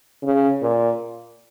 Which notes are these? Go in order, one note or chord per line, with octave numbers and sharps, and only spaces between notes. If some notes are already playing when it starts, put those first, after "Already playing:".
C#3
A#2